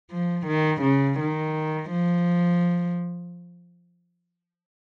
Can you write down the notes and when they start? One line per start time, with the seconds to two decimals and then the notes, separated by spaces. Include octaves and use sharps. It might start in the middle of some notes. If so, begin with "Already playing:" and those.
0.10 F3
0.46 D#3
0.82 C#3
1.18 D#3
1.91 F3